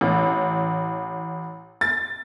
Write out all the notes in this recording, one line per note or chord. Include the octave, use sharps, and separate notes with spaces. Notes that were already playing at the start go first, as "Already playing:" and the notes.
A1
A6